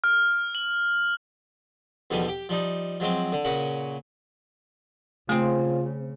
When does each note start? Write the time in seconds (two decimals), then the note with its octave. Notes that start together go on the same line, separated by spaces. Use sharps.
0.04 F6
0.55 F#7
2.10 E2 B2 D3 F3 G3
2.28 G4
2.49 F3 G3 D#4
3.00 F3 F#3 G#3 C4
3.32 D3
3.45 A#2 C#3 C#4 F#4
5.29 C#3 A3 C4 F4 G#4